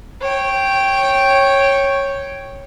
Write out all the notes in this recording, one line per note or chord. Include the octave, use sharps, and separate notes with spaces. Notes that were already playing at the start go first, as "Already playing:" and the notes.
C#5 G5